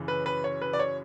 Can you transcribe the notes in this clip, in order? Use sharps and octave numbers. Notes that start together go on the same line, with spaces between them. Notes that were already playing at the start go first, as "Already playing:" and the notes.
Already playing: F#2 C#3 E3
B4
B4
C#5
B4
D5
C#5